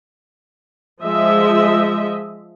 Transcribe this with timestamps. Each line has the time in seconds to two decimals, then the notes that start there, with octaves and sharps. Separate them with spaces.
1.02 F3 G#3 D#5 E5